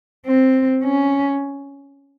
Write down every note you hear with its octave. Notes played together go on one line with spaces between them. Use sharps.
C4
C#4